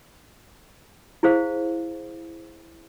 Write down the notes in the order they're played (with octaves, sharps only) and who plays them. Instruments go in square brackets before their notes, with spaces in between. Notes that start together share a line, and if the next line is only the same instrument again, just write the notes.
[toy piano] E4 G#4 C5 F5